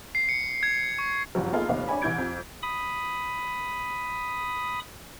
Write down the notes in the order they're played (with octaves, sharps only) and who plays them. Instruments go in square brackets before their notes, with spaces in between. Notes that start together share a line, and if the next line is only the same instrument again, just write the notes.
[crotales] C7
C#7
G#6
C#6
[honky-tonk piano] F#1 G2 F3 F#3
A#3 B3 D#4 F4 G#4 A4
F1 D#2 B3 D#4 B4 F5
D4 C#5 G#5 B5
C2 E3 E4 G6 G#6 D7
F2
[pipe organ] B5 D#6